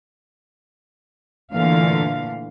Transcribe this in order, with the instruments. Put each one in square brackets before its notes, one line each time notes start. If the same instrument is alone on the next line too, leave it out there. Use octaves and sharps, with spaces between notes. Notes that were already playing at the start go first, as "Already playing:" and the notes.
[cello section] A#2 D3 E3 A3 F5